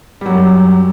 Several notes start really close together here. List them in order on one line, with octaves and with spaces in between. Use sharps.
G3 F#3 F#2